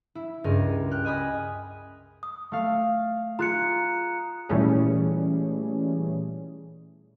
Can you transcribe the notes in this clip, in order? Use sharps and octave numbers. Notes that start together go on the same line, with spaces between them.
E4
C#2 G2 G#4 A#4
G5 F6 F#6
D#5 G#5 B5 D#6
D#6
A3 F5
F4 G#4 A#5 F#6 C#7
A#2 E3 G3 A3 C#4 G#4